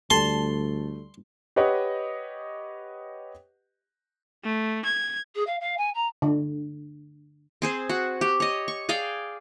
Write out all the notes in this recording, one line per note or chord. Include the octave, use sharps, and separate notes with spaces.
D2 D3 G3 A3 A5 C6
G4 B4 C#5 D#5 F#5
A3
G#6
G#4
F5
F5
G#5
A#5
D3
C4 G#4 C5
F#4
G4
C#5 D#5
C#6
G#4 D5 F5 G5